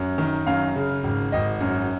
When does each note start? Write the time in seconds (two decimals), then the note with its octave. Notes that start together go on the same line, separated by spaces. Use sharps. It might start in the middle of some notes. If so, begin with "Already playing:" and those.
Already playing: F#2
0.18 D#3
0.47 F#2 F5
0.76 C#3
1.04 G#1
1.32 G#1 D#5
1.60 F#2